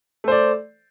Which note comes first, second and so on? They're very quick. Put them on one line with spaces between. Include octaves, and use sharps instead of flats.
A3 C5 D5